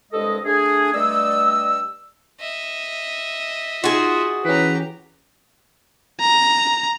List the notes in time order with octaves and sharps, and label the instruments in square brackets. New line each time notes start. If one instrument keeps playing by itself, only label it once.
[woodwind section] C2 G2 G#3 A4 D#5
A3 D4 G#4
G2 G3 A3 D5 D#5 E6
[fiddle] D#5 E5
[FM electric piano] D#4 [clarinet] F4 [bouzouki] F#4 G#4
[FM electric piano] E3 C#4 [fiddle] G4 A#5 [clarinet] B4
[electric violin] A#5